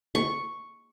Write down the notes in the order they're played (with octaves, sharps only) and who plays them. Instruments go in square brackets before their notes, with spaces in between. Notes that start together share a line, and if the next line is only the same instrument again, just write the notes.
[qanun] C#6